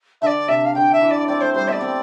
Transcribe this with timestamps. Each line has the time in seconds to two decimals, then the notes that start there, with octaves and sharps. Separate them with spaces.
0.22 D3 D5 E5
0.48 C3 E5
0.65 F5
0.75 D3 G5
0.93 E5
1.01 E3
1.11 D5
1.28 C4 D5
1.41 A3 C5
1.54 G3 C5
1.68 B3 D5 E5
1.81 C4